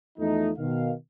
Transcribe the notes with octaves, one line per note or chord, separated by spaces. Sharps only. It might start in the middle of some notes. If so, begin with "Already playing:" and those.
E2 F3 A3 D#4
B2 D#3 F5